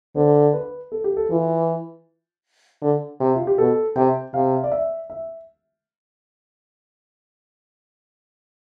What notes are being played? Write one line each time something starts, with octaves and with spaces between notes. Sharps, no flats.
D3 C5
B4
A4
G4
A4
E3 F4
D3
C3
F4
G4
B2 A4
C3 G5
C3 F5
D5
E5
E5